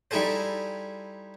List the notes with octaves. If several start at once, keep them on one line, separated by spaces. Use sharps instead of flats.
G3 D#4 E4 G#4 A4 C5